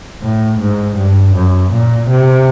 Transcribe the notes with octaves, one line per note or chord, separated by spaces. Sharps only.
A2
G#2
G2
F#2
A#2
C3